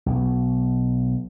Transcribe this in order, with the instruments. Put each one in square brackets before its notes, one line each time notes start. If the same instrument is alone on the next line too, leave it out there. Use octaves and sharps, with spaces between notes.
[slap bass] B1